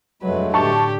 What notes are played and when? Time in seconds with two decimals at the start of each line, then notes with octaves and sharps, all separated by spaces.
0.22 F1 G2 F#3 G#3 A3 B4
0.54 A2 D3 G4 A5 C#6